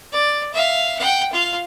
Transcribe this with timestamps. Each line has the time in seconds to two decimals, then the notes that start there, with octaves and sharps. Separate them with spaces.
0.12 D5
0.54 E5 F5
0.99 F#5 G5
1.33 F4 F5